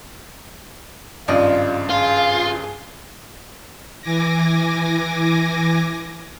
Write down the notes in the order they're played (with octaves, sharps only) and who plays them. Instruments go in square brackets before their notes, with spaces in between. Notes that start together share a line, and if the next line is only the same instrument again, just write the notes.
[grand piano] G#1 G2 C#3 [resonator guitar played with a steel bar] F3 D5 D#5 [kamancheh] F4
[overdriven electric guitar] F4 [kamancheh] G#4
[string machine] E3 G#5 D6 A#6